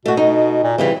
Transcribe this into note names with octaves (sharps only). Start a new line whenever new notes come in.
B2 A3 F#4
D#4
A#2
C#3 E3 G3 C4